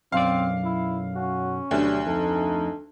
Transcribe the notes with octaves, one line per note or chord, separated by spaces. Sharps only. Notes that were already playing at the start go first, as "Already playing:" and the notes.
B1 F#2 C4 D5 F5
E4
C#4 F#4
D2 B2 F#3 G3 A3
F2 D#4 A4